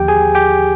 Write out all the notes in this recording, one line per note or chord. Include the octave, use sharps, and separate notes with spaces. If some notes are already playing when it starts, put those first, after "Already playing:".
Already playing: D#2 D3 F3 G4 G5
G#4 G#5
G4 G5